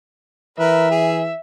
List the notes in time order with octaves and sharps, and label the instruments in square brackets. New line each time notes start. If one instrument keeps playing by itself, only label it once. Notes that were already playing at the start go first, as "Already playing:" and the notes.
[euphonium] E3 [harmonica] A#4 B4 [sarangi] E5
[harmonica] G#4